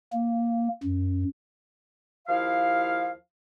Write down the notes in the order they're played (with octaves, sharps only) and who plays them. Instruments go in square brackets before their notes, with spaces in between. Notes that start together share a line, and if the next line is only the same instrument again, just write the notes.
[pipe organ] A#3
F#2
[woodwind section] D#2 F3 E4 F5